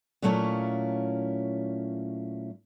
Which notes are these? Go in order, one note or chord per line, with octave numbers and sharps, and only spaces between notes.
A#2 F#3 A3 C#4 E4 F4